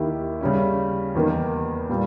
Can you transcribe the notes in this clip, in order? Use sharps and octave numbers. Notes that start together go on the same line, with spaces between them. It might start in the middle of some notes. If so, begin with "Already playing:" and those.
Already playing: D#2 D#3 A#3 E4 G4
C#3 G3 C#4
E2 D#3 A#3
A#2 G3